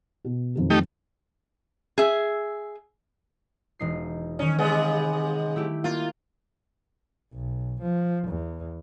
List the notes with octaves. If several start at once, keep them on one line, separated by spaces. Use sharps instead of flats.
B2
F2 D#3 F#3
A3 D#4 G4
G#4 E5
E1 D#4 C7
D#3 C#4 D#4
C3 G#3 B3
A3 E4 G4
A#3 F4
B1
F3
E2